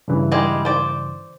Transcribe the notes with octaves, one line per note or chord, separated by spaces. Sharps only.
G2 C#3 E3
G3 G#3
C5 D5